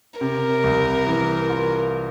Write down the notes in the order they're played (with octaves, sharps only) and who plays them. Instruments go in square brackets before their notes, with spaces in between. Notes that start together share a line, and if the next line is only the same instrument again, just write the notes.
[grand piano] C3 [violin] A#4
[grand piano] C2
E3
F4